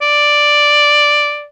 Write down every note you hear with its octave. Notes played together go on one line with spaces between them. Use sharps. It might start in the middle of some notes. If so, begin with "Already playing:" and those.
D5